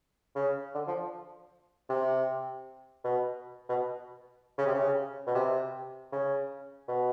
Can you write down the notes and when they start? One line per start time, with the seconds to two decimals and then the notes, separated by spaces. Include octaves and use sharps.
0.36 C#3
0.75 D3
0.87 F3
1.90 C3
3.04 B2
3.69 B2
4.58 C#3
4.67 C3
4.74 C#3
5.27 B2
5.35 C3
6.12 C#3
6.88 B2